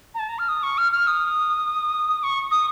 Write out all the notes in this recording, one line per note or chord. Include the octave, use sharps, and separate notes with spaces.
A#5
A5
A#5
F6
D#6
C#6
F6
F6
D#6
C#6
D#6